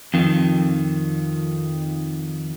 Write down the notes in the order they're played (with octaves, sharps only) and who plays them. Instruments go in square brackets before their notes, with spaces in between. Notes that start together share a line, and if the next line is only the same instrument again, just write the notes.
[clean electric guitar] F2 D#3